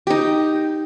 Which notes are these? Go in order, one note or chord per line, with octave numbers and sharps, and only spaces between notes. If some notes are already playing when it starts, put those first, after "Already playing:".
D#4 G4